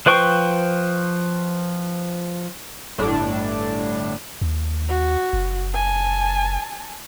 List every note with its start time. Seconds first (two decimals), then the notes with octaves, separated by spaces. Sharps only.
0.06 F3 B4 C5 G5 C#6
2.98 G1 A2 D4
4.41 D#2
4.89 F#4
5.33 F#1
5.74 G#5 A5